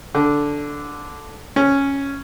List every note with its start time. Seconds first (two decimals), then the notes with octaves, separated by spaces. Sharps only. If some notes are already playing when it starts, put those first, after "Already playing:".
0.15 D3
1.56 C#4